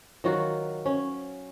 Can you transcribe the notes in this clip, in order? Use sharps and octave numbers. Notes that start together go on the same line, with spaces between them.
D#3 F#3 F4 F#4
C#4